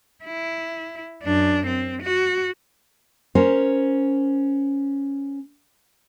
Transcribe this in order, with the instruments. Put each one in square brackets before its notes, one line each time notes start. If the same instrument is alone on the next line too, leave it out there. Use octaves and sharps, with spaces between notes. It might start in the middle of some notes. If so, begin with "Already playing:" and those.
[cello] E4
F#2 D4
C4
F#4
[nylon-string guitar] C#4 A#4 C5